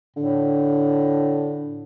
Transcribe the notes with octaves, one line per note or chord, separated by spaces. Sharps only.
A2 D3